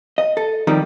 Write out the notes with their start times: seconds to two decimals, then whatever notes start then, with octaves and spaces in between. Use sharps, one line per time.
0.18 D#5
0.37 A4
0.67 C3 D#3 F3 G3 D#4 A#4